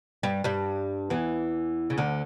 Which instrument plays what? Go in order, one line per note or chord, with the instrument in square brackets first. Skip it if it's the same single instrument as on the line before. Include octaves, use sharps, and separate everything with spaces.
[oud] G2 G3
G2 G3
E2 E3
C#3
D2 D3